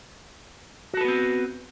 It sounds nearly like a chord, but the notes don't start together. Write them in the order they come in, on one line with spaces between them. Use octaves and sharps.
F#4 A4 B4 B3 C4